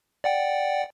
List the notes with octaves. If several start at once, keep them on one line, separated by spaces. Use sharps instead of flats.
D5 F#5 G5